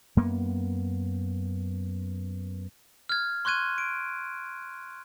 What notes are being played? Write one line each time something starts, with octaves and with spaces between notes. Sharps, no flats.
F#2 A#3 B3
F6 G#6
C6 C#6 F#6 G#6 D#7
D7